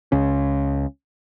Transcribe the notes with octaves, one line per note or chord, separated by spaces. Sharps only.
C#2 C#3 C#4